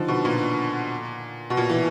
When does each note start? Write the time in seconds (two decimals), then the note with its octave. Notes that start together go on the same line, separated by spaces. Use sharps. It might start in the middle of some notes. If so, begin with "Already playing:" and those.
Already playing: D3 D#3 F3
0.08 B2
0.25 A#2
1.50 B2
1.57 A#2
1.70 E3